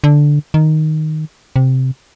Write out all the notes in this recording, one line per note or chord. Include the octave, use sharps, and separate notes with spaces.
D3
D#3
C3